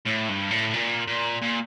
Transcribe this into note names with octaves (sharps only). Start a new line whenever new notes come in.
A2
G2
A2
A#2
A#2
A#2